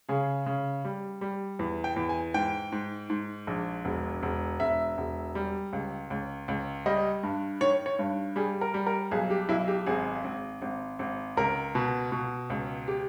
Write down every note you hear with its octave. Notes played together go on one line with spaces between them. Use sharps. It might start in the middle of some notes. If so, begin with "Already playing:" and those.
C#3 G#4
C#3
G3
G3
E2
G5
E2
G#5
G#2 G5
G#2
G#2
A#1
E1
E1
E1 E5
E1
G3
C#2
C#2
C#2
G3 D#5
G2
D#3 C#5
C#5
G2
G3 G#4
A#4
G3
A#4
B1 G#4
G4
B1 E4
G4
G#1 G#4
G#1
G#1
G#1
C#2 A#4
B2
B2
C#2
G4